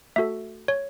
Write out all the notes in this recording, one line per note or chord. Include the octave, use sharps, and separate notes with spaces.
A3 F#4 A4 E5
C#5